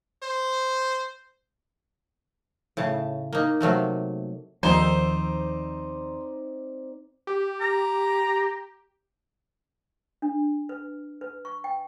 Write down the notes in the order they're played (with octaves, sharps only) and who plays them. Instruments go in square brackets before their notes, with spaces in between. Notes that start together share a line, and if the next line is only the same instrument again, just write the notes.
[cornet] C5
[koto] A2 C#3 A5
A#3 D#4
C3 F#3 A3 A#3
[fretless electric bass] D#2 F3 [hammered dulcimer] C4 D5 [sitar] D#4 [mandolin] C5
[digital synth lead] G4
[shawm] A#5
[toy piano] D4
B4
B4
C#6
G5